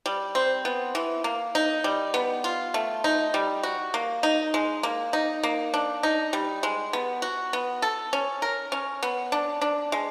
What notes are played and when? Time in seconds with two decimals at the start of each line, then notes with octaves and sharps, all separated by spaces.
0.06 G3
0.35 C4
0.65 B3
0.95 E3
1.24 A#3
1.55 D#4
1.84 G3
2.14 B3
2.44 F4
2.74 A3
3.04 D#4
3.34 G3
3.63 F#4
3.94 A#3
4.23 D#4
4.54 G#3
4.83 A#3
5.13 D#4
5.43 A#3
5.74 D4
6.03 D#4
6.33 G3
6.63 G#3
6.93 B3
7.22 F#4
7.53 B3
7.82 A4
8.13 C#4
8.42 A#4
8.72 C#4
9.03 B3
9.32 D4
9.61 D4
9.92 G#3